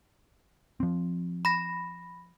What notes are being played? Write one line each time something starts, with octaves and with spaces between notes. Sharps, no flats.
F3 C4
B5 A#6